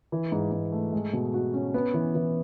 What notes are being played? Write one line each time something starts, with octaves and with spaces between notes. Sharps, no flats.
E3
G#2
G#2
A3
G#3
B2
F#4
C#4
B3
E3
E3